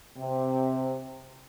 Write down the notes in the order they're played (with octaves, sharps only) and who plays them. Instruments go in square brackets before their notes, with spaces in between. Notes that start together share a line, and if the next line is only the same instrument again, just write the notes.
[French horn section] C3